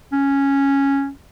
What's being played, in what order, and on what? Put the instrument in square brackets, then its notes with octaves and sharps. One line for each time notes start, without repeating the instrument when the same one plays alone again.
[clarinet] C#4